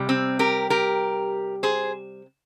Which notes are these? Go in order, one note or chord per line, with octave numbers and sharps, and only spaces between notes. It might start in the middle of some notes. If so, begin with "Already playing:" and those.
Already playing: C3 G3
C4
G4 A#4
G4 A#4
G#4 C5